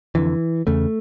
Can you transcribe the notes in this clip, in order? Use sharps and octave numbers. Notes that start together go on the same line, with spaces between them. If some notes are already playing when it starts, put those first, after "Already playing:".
F2 D3 E3
E2 C#3 A3